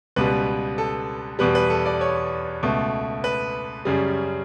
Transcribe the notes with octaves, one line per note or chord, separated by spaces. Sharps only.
C#2 B2 G3 B4
A4
E2 B2 G3 B4
B4
A4
D5
C#5
C#2 B2 A3
B4
F#2 C#3 G3